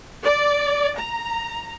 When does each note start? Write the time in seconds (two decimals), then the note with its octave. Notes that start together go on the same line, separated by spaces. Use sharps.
0.24 D5
0.99 A#5